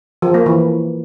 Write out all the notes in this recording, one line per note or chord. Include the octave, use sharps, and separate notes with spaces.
F3
A#3
E3